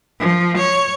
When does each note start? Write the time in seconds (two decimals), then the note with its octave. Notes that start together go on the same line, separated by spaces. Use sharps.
0.20 F3
0.58 C#5